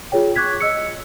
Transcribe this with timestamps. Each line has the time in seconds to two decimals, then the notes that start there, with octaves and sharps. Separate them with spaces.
0.12 F4 G#4 C#5 G5
0.36 C#6 D6 F#6 G#6 B6
0.60 D#5 E6 C#7